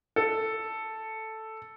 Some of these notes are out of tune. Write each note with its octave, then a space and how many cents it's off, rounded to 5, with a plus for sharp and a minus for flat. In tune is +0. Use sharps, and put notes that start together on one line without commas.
A4 +0